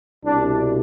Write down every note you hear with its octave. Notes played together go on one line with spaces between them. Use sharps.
C2 B2 D4